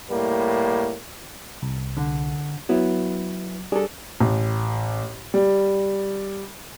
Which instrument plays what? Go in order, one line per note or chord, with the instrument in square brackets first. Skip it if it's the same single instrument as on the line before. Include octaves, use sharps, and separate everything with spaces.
[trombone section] A2 G3 A#3
[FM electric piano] C2
[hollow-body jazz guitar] D3
[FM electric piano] F#3 [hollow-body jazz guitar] B3 E4
[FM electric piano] G3 G#4 [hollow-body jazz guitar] D4 A4
[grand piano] A1
G3